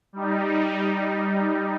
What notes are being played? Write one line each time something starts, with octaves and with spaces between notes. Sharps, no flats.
G3 D#4